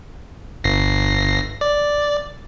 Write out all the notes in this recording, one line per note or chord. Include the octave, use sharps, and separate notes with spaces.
G1 A#6 C7
D5